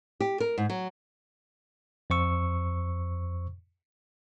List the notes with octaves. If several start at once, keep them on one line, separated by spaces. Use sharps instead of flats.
G4
A#4
G#2
F#3
F2 C5 C#6 E6